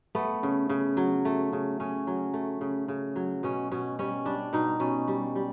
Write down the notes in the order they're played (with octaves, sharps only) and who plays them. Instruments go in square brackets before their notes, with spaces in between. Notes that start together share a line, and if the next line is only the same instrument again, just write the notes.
[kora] A3 B3
C#3
C#3
F#3
A3
C#3
C#3 C#4
F#3
A3
C#3
C#3
F#3
B2 C#4
B2 C#4
G3 C#4
G3 D4
B2 D#4
B2 C#4
G3
G3